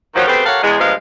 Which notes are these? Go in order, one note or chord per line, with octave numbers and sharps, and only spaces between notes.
D#3 F3 F#3
C#3 A3 B3 C4 G4 B4
G4 A4 A#4 C#5 F5 F#5
E2 G#3
G2 A#2 F3 G#3 B3 F5